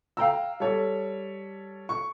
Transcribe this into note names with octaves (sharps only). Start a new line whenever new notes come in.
F5 G5 A#5 E6
G3 A4 C#5
C#6